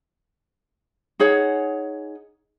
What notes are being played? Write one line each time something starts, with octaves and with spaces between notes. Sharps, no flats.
D#4 G#4 C#5 F#5